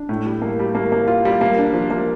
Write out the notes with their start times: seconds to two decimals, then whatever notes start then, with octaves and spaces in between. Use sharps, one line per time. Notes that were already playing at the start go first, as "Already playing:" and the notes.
Already playing: D4
0.09 A2
0.26 G3
0.42 A#3
0.59 G3
0.75 A#3
0.92 A#3
1.08 F4
1.25 G3
1.41 A#3
1.58 D4
1.73 F3
1.90 A#3